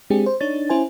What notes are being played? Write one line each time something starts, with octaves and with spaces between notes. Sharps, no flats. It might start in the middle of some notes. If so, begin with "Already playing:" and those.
G#3 C4 D4 G4 G#4
C5
D4 D#4 C#5 A6
C#4 E4 C5 G#5